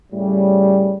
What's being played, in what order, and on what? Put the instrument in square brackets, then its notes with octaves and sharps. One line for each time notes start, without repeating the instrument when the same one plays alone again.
[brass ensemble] A2 C#3 G3